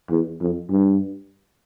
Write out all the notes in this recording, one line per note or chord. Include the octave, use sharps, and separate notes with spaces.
E2
F2
G2